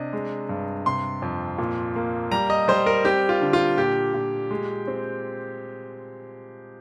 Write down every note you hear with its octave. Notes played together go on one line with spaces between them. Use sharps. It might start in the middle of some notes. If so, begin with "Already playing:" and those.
Already playing: C3 D4 D#5
G#3
G2
C3 C6
F2
A#2
A#3
G3 A#5
D#5
G3 C5
A#4
C4 G4
F4
D3
F4
A#2 G4
A#2
G#3
C4